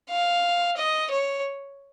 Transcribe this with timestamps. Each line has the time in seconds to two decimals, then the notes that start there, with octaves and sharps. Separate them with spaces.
0.10 F5
0.77 D#5
1.11 C#5